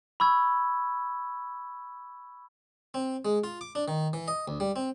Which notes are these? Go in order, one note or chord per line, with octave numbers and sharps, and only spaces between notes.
B5 C#6 E6 G#6
C4
G#3
F4
D6
D4
D#3
E3
D#5
D2
G3
C4